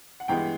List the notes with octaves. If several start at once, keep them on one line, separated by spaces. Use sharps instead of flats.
F#5
G2 E3 G#3 B3 G5